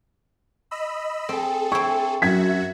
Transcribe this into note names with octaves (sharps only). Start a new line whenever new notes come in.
D#5 B5 E6
C4 G#4 A4
C4 E4 C#6
F#2 F#4 E5 G#6 B6